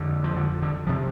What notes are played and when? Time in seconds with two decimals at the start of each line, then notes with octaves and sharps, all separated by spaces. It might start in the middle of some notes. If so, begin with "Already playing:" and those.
Already playing: F2 D3
0.24 F3
0.36 D3
0.62 D3
0.87 C3 F3